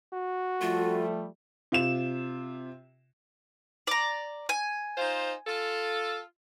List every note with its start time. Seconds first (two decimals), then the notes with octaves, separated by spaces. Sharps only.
0.13 F#4
0.61 F3 G3 A3 F4
1.72 C3 F4 E7
3.87 D5 A#5
4.49 G#5
4.97 D#4 F4 C5
5.47 F4 A4